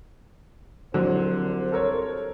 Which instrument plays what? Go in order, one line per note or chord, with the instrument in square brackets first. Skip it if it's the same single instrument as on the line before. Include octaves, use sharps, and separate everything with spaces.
[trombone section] C2 C5 [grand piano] D3 F#3
[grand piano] A4 A#4 C#5